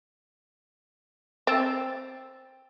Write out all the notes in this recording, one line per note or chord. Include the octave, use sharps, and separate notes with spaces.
C4 E6 A6